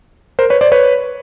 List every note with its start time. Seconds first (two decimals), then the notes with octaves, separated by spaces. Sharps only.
0.39 A#4 C5
0.50 B4 C#5
0.61 C5 D5
0.72 B4 C#5